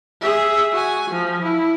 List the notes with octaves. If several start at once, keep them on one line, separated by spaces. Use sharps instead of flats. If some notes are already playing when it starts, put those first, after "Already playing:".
G#4 E5
F#4 G#5
F3
E4